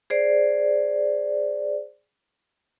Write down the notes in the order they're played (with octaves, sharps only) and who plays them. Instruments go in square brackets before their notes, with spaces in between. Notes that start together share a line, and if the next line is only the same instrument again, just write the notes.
[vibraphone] G#4 C5 D5